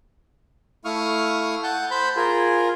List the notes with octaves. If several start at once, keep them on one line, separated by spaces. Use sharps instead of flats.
A3 E4 F5 C#6 D#6 F6
F#5 A5 G6
C5 B5 G6
F4 G#4 A#4